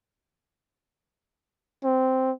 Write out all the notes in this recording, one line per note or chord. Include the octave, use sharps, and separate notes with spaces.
C4